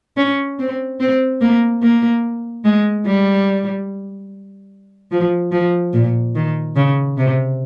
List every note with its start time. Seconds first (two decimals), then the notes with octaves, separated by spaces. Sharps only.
0.17 C#4
0.59 C4
1.00 C4
1.41 A#3
1.82 A#3
2.65 G#3
3.06 G3
5.11 F3
5.52 F3
5.93 A#2
6.35 D#3
6.76 C#3
7.17 C3